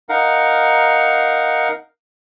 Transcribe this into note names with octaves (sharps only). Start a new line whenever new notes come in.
D#4 A#4 F5 F#5